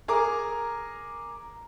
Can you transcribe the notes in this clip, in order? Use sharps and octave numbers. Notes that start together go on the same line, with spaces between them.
G#4 A#4 A#5 D6